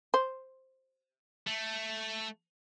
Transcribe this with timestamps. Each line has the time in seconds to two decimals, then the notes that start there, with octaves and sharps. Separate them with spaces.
0.14 C5
1.47 A3